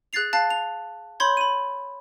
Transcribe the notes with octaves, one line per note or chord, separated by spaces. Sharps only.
G#4 F#6 G#6 A6 C7 F7
F5 A5 F#6 A6 C7
F7
C#5 B5 C6 G6 G#6
B5 D#7